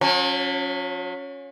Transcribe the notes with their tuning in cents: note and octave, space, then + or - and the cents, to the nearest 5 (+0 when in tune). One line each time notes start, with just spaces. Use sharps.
F#3 -45 C#4 +0